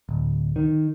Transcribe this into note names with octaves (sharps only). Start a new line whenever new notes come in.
D1
D#3